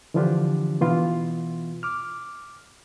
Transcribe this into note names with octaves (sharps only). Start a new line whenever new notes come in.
D3 E3 F3 D4 F4 G4
B2 E3 B3 F4
D6 F6